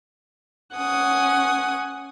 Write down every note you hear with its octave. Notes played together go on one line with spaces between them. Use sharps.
C#4 F#5 G#5 D#6